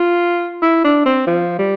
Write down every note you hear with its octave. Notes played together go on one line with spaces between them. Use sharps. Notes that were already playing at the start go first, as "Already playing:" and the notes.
Already playing: F4
E4
D4
C4
F3
G3